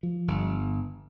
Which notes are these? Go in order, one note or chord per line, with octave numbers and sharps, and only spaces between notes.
F3
G1